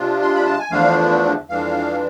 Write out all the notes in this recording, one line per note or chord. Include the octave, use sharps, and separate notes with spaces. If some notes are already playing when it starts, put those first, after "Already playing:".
Already playing: C3 G#3 D4 F4
C6
B5
A5
G#5
E2 D3 F3 A3 D4 F5
F2 E3 G#3 D4 F5